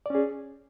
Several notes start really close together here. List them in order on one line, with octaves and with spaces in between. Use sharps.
D5 C#4 G#4